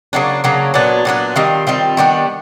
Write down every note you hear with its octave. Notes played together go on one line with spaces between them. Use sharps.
C#3 F#3 A#3 D4
C#3 F#3 A#3 D4
A#2 F#3 B3 D4
A#2 F#3 B3 D4
D#3 G3 C4 F4
D#3 G3 C4 F4
D#3 G3 B3 D4